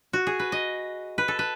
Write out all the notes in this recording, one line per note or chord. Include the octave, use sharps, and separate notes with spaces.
F#4
G#4
B4
D#5
B4
A4
B4